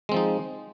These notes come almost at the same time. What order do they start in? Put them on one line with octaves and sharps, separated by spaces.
G#3 C4 F3 D#4